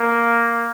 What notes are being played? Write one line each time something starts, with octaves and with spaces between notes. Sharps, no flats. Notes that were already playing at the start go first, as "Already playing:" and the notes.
Already playing: A#3